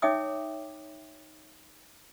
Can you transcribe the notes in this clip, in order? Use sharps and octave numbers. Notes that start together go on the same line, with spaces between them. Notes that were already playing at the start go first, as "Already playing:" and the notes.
D#4 C#5 E5 G5 D6 D#6